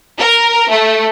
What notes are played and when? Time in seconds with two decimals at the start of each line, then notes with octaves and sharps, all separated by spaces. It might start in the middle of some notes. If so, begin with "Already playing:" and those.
0.18 A#4
0.69 A3